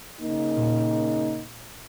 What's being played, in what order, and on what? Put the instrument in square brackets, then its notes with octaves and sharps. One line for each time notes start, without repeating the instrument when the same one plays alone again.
[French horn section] C#3 A#3 D#4
[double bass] A#2